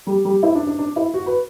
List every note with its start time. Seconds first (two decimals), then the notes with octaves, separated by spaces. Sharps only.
0.07 G3
0.25 G3
0.43 E4
0.55 D4
0.67 D4
0.79 D4
0.96 E4
1.14 F#4
1.26 B4